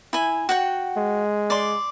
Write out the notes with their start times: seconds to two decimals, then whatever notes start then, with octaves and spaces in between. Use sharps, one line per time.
0.13 E4 G#5
0.49 F#4 F#5 G5
0.97 G#3
1.50 D5 C6